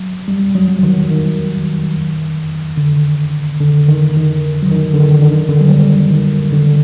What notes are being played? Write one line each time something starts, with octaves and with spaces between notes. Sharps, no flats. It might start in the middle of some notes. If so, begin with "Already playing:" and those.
Already playing: F#3
G3
F#3
F#3
D#3
D#3
D3
D3
D#3
D#3
F#3
D#3
D3
D#3
D3
D#3
D3
F#3
G3
D#3
D3